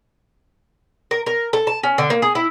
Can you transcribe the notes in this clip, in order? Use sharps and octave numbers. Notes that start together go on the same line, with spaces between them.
A#4
A#4
A4
A5
C#4
D3
A#3
G#4
E4